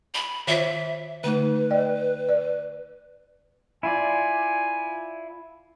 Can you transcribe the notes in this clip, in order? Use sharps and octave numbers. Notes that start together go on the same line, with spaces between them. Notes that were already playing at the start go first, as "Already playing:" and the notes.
B5
D#3 F4 C5 E5
D3 A3 D#4 B4
D5 D#5 G5
D5
E4 F4 D5 G#5